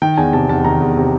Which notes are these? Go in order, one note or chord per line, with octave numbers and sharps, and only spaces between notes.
D#3 G5
E2 G#5
C3 A5
E2 A5
D#3 A#5
E2
C3